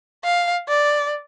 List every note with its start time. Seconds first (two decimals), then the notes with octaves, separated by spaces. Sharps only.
0.24 F5
0.68 D5